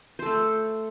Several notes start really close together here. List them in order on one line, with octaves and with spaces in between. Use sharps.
C5 A4 A3